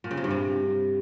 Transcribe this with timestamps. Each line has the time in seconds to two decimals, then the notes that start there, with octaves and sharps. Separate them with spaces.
0.04 A#2
0.11 C#3
0.17 C3
0.24 G2
0.31 C3